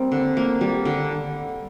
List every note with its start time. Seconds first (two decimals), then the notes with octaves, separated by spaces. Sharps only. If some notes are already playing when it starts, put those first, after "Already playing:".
Already playing: G3 A#3 C4
0.12 D3
0.37 A#3
0.61 G3
0.85 D3